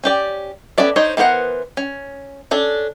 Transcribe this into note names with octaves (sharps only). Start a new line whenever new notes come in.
C#4 G4 D5
B3 C#4 A4 D5 E5
D4 D#4 C5 C#5
E3 B3 A#4 C5 F#5
C#4
C#4 D4 A4